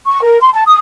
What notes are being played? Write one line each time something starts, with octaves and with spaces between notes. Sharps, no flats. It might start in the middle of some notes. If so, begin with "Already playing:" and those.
C#6
A#4
C6
A5
D#6